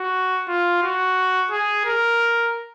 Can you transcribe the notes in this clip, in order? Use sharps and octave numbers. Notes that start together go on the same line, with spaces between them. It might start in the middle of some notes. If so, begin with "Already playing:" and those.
Already playing: F#4
F4
F#4
G#4
A#4